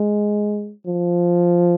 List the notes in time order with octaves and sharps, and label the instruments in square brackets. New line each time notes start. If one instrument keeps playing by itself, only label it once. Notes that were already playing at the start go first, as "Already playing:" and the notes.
Already playing: [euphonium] G#3
F3